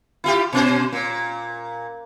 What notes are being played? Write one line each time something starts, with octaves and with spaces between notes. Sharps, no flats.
E4 F4 G4
B2 C#4 C5
A#2